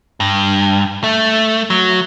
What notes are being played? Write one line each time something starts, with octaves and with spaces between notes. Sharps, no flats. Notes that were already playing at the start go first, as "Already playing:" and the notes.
G2
A3
F#3